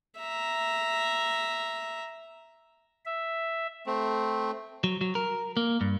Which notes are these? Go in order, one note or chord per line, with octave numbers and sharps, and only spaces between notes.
E5 A#5
E5
A3 C4
F#3
F#3
A#4
A#3
G2